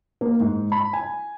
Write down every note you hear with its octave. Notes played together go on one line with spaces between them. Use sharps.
A#3
G#2
B5
G#5